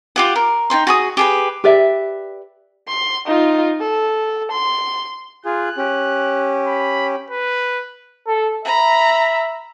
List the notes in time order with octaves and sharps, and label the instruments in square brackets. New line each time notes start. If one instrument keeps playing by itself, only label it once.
[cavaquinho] F4 G4 F#5
A#4
D#4 A#4 G5 C6
F#4 G#4 D#6
G4 G#4 B4
[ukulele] G4 B4 D5 E5
[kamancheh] C6
D#4 F4
A4
C6
[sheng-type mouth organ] F4 G#4 [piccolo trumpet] F#6
[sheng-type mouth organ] C#4 G4
[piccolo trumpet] B5
B4
[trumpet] A4
[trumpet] E5 [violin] A#5 B5